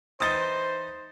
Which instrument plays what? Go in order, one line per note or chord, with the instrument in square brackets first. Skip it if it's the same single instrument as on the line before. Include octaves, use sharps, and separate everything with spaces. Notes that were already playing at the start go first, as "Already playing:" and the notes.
[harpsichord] E3 D#4 [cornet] C5 [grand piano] D#6 A6 G7